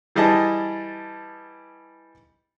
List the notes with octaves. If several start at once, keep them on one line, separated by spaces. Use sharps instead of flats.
E3 G3 G#4 D#5 A5